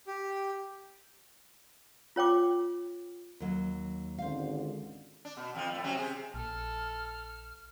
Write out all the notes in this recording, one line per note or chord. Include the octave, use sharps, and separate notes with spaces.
G4
F4 C#5 G5 D6
D#2 F#3
G#1 C#2 D3 C5 F5
D4
B2
F2 F3
A2 A3
C3 F#3 C#4
C3 G#4
A#1 A4 F6